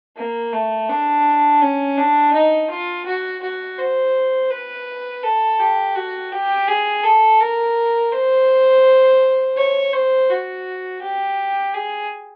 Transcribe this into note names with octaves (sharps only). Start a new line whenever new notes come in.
A#3
A3
D4
C#4
D4
D#4
F4
F#4
F#4
C5
B4
A4
G4
F#4
G4
G#4
A4
A#4
C5
C#5
C5
F#4
G4
G#4